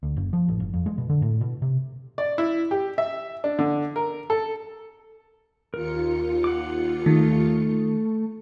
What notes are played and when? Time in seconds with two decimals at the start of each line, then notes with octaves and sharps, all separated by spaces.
0.03 D2
0.16 F#1
0.33 F3
0.48 A1
0.60 G1
0.74 F2
0.86 G#3
0.98 B2
1.10 D3
1.22 A2
1.41 B2
1.62 C3
2.18 D5
2.38 E4
2.71 G4
2.98 E5
3.44 D4
3.59 D3
3.96 A#4
4.30 A4
5.74 D#2 F4 A#4 C#7
6.44 F#5 D6
7.06 D#3 A3